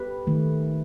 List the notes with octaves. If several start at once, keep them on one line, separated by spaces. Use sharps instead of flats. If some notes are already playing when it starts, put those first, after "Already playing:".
Already playing: G4 B4
D#3 A3